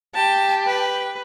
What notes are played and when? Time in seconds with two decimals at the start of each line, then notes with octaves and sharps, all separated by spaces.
0.15 G4 G5 A5
0.66 B4